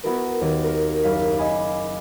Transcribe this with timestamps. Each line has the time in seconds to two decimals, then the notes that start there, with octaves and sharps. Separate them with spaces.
0.04 B3 E4 F#4 A#4 B4
0.41 D#2
0.64 A#4
1.03 F#1 F5 B6
1.36 D#5 G#5 B5 D6